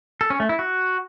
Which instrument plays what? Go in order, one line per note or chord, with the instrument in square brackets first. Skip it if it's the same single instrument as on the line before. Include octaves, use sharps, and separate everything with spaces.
[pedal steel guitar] A4
C#4
A3
E4
F#4